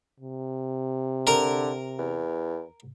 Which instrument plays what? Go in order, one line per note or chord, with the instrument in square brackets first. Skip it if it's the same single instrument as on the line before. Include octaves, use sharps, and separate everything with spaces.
[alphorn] C3
[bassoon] D3 [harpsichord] A#4 A#5
[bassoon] E2